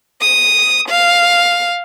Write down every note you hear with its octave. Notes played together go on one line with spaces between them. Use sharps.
D#6
F5